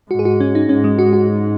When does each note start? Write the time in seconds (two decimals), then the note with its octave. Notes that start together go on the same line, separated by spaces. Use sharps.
0.11 G#2 F#4
0.19 G#4
0.25 F#4
0.40 C#4
0.55 D#4
0.69 G#2 C#4
0.84 G#3
0.99 F#4
1.13 F#4